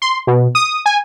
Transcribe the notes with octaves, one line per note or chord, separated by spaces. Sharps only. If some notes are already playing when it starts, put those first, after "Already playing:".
C6
B2
D#6
G#5